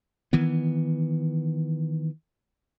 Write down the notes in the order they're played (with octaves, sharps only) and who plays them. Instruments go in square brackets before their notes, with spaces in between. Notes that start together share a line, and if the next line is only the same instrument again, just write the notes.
[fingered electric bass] D#3 E3 B3